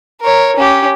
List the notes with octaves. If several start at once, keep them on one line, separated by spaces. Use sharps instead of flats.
A#4 C#5
C#4 G4